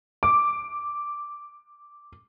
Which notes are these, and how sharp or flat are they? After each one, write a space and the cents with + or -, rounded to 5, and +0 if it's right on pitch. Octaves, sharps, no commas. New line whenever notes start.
D6 +0